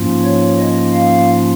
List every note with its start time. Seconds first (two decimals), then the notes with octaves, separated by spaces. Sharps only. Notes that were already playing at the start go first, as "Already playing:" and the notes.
Already playing: G#2 F3 A#3 C#4 F4
0.23 C#5
0.58 D#5
0.93 F5